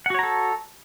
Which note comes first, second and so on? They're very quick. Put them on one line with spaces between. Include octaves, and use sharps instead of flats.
F#5 F#4 C#5 A#5 A4